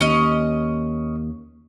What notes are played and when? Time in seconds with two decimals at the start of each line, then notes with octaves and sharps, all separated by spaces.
0.01 D#2 C#4 D#5